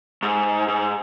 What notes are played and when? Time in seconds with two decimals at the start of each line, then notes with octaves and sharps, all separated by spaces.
0.23 G#2
0.68 G#2